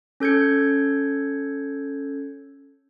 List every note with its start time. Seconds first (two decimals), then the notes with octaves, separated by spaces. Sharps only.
0.20 C#4 A4 G6 G#6 C#7